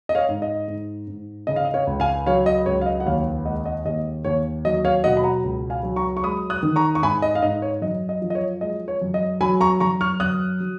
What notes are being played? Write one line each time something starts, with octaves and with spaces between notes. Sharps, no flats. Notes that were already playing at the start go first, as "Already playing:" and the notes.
D#5
C#5 F5
G#2
D#5
G#2
G#2
C#3 D#5
F5
D#5
C#5 F5
C#2
F5 G#5
F#3 C#5 F5
D#5
C#2 C#5
F5
D#5
F#5
D#2 C#5 F5
G#3 D#5 F#5
D#5 F#5
D#2 D#5
D#2 C#5
F#3 D#5
C#5 F5
B2 D#5 F#5
B5
F#5 A#5
C#2
F5 G#5
F#3
A#5 C#6
C#6
G#3 B5 D#6
D#6 F#6
D#3
A#5 C#6
C#6
G#2 G#5 B5
D#5
F5
G#2 D#5
C#5
F#2 D#5
D#5
F3
D#5
C#5
G#3 D#5
C#5
F#2
D#5
F#3 G#5 B5
A#5 C#6
F#2 A#5 C#6
C#6 F6
F#2 D#6 F#6
F#3